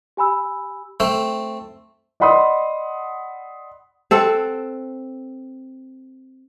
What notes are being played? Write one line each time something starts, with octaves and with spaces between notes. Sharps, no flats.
G4 G#5 B5 E6
A3 C4
D5 D#5 F#5 B5 C6 D#6
C4 A4 F#5